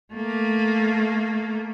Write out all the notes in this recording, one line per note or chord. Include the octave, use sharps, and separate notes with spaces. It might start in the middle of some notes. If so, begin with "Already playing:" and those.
A3 A#3